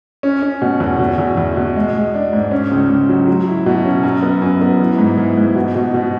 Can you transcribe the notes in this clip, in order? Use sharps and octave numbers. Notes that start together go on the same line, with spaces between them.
C#4
C#4
B2
E2
B2
E2
E2
B2
G#3
G#3
D4
G#2
C#4
C#2
C#2
F#3
F#3
E4
B2
C#4
F#2
B3
F#2
B3
E3
G#2
E3
G#2
B2
B2
B2